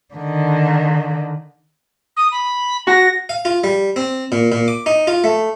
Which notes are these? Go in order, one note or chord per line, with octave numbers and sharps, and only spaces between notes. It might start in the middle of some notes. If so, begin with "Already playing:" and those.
D3 D#3
D#6
B5
F#4 A#6
F5
F4
G3
C4
A#2
A#2
D6
D#4
F4
A3